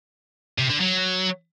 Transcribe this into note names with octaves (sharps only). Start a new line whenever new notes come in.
C3
D3
F#3